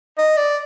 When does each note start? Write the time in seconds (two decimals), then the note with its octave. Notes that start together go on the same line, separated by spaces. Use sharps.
0.18 D#5
0.37 D5